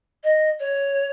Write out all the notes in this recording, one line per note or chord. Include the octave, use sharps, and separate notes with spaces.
D#5
C#5